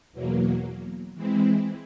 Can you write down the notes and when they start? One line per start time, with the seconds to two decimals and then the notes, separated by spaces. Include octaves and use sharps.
0.12 E2 B2 F#3 A#3
1.15 E3 G#3 C4 E4